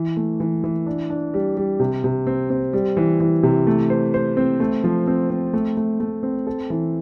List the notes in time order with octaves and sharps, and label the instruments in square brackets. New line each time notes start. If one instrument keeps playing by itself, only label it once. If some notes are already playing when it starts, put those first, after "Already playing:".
Already playing: [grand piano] E3
A3
E3
E3
D4
D4
G3
G3
C3
C3
C4
C4
G3
E3
E3
C3
A3
C5
C5
C4
A3
F3
C4
C4
A3
A3
A3
C4
A4
E3